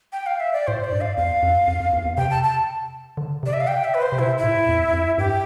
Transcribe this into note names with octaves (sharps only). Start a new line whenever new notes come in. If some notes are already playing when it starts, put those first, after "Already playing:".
G5
F5
E5
D5
A2 C5
D5
G2
F5
E2 F5
F2
F2
F2
E2
E2
C3 G5
A5
A5
D3
C3 D5
E5
F5
G5
E5
B4
C5
C3
B2 E4
E4
A2
E2
F2
G2 G4